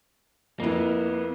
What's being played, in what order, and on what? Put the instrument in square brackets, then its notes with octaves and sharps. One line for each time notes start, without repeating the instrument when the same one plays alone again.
[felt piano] F2 E4 [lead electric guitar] A#3 B3